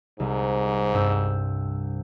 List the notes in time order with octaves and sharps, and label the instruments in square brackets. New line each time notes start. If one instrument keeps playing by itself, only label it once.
[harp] C2 [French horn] G#2
[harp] G2 C4 E6